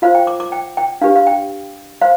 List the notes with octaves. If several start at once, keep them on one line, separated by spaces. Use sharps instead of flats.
F4 C5 F5
G5
D6
D6
G5
G5
D4 G4 B4 F5
F5
G5
C5 F5